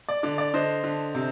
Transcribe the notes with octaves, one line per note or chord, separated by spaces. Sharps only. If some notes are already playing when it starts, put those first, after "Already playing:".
D5
D3 D5
D5
D3 C5 D#5
D3
C3